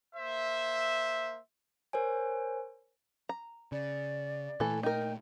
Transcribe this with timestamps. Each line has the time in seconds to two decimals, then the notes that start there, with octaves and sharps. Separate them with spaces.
0.15 A#3 C5 E5
1.93 A#4 C5 C#5 G#5
3.29 A#5
3.72 C#3 D5
4.60 A#2 E3 A3 A4
4.83 D#4 A#4 G5